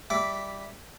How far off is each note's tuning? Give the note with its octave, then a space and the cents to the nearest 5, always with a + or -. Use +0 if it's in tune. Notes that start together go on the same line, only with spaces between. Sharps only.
G3 +5 E5 +0 D6 -15